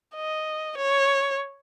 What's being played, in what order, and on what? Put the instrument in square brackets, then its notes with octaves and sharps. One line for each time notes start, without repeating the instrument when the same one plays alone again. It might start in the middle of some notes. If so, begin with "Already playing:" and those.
[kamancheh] D#5
C#5